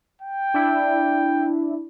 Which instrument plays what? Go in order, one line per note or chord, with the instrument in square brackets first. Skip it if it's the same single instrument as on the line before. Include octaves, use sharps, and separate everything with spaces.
[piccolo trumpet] G5
[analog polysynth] D4 E4